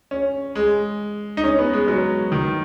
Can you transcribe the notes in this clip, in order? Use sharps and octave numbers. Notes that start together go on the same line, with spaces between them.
C#4
G#3
D#4
C#4
B3
G#3
F#3
D#3